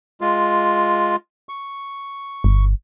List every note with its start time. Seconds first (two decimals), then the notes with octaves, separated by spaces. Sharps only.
0.21 G#3 F4
1.49 C#6
2.44 G1